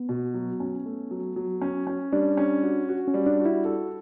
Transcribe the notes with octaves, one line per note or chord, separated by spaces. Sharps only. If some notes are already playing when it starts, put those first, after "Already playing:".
Already playing: B3
B2
F#3
C#4
A3
F#3
F#3
C#4
C#4
G3 D4
C#4
F#4
F#4
C#4
G3
D4
F#4
E4
A4